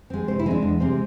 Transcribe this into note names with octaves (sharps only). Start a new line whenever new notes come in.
G#3 C4
C3 C5
E4
G#3 C4 D4
E2
C3 G#3 C4